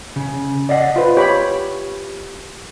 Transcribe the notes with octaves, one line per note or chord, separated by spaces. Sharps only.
C#3
D5 D#5 F#5
F4 B4
G4 C#5 B5